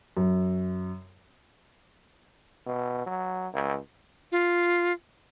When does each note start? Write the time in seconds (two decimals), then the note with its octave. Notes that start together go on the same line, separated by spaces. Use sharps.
0.17 F#2
2.66 B2
3.06 F#3
3.54 C#2
4.32 F4